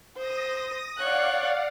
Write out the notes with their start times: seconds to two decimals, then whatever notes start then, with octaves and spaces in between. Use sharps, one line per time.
0.17 C5 D#6 A#6
0.98 C#5 D5 F5 F#5 F#6